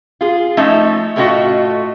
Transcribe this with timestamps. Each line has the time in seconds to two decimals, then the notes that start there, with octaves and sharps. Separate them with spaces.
0.21 F4 G#4
0.57 F3 A3 C#4 D#4 E5
1.16 A2 A3 C#4 F4 F#4 D#5